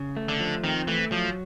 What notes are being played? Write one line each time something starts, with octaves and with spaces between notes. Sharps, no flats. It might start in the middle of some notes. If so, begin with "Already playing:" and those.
Already playing: C#3
A3
D3
F3
D#3 C4
E3 A3
F3 F#3